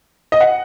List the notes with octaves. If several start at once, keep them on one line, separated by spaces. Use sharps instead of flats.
D#5
F#5